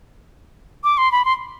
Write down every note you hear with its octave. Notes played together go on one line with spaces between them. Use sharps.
D6
C6
B5
C6